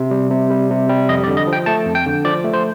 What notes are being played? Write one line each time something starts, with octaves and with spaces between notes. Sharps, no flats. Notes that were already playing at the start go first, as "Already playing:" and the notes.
Already playing: C3
G3
C3
G3
C3
G3
F2 D#5
D5
D3
D#5
F3
G5
A3 A5
F2
G5
D3
F3 D5
A3
C5